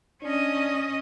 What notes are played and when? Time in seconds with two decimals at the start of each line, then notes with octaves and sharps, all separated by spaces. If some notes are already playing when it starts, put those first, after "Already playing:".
0.23 C#4 D4 D#5